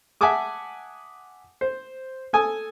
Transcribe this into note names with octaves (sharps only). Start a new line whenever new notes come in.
E5 F#5 G#5 A5 D6 D#6
C5
A4 G#5 D#6